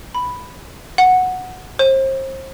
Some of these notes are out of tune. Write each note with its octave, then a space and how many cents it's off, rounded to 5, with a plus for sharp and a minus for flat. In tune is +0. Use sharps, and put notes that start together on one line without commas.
B5 +0
F#5 -5
C5 +35